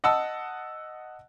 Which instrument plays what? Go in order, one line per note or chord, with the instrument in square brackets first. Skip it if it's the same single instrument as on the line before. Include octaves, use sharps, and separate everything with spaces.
[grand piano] D#5 F#5 A5 E6